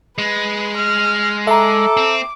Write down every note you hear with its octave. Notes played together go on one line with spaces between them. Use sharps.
G#3 B4
F6
A4 E5 A#5 D6
C4